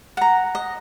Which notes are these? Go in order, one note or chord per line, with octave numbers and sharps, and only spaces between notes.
F#5 A#5
D#5